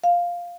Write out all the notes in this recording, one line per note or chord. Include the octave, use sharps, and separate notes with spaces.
F5